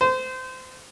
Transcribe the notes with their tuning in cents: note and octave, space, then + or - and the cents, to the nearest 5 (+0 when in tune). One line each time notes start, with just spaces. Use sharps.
C5 -25